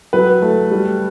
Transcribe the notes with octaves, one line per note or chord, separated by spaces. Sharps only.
F#3 B4
A3
G3